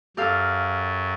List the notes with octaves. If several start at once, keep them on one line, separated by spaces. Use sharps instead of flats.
F#2 G4 A4 F5